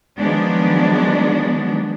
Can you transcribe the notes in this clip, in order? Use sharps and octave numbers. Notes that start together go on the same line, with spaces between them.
D#3 F3 F#3 G#3 B3 D4